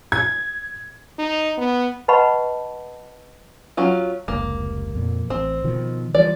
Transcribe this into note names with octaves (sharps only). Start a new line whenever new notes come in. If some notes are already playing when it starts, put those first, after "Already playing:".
G#6
D#4
B3
B4 D#5 F#5 A5 B5 C#6
F#3 C#4 F4
F1 C#2 A#3
F2 A#2
A1 C4
B2 D#3 F3
E3 F3 G3 D5